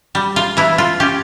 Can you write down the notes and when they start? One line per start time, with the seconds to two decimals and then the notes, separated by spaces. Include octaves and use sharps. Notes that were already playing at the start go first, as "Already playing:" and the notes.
0.15 G3
0.36 F4
0.57 E3 E4
0.78 F4
1.00 C#4 G4